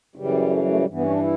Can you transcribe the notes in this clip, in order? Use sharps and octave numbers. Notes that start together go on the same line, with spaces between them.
F#2 C#3 E3 G3
A3
G3
A3
G3
G2 E3
B3
C#4
D4
E4